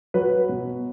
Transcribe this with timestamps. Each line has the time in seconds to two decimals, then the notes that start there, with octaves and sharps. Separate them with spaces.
0.14 F#3 B4
0.49 B2